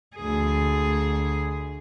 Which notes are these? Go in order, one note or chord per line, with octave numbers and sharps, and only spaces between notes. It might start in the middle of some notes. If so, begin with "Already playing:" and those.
D2 G#4